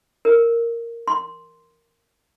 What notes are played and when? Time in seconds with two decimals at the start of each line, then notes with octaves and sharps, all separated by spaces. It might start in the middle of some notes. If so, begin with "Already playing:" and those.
0.25 A#4
1.08 C6